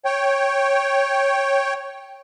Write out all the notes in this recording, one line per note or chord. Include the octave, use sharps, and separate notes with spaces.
C#5 G5